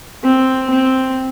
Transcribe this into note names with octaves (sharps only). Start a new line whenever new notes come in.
C4
C4